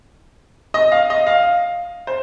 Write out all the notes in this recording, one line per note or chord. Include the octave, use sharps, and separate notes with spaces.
D#5
F5
D#5
F5
C5